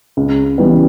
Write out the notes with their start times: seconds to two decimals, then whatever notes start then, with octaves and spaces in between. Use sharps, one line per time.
0.17 C#2
0.58 C#3 E3 G3 B3